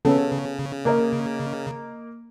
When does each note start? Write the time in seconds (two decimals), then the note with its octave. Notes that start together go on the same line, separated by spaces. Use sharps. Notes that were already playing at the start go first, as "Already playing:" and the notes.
0.05 C#3 B3 C#4 A4
0.85 A#3 A#4 D#5